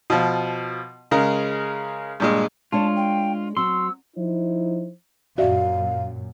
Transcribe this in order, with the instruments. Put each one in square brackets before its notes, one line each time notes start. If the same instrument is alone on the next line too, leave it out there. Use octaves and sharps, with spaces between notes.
[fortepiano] B2 F3
C#3 G#3 A#4
G2 A#2 G#3
[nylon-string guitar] G#3 D4 C#5 [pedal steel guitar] F4 [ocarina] A5
[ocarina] G5
[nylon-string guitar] F#3 C4 [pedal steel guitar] C6 [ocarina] E6
[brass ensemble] F3 D#4 E4 C5
[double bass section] F#2 A#2 [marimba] F#4 D5 E5 [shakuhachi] F5